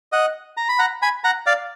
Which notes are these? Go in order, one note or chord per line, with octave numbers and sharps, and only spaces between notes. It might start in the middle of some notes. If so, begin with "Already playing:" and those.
D#5 F#5
A#5
B5
F#5 A#5
G#5 B5
F#5 A#5
D5 F5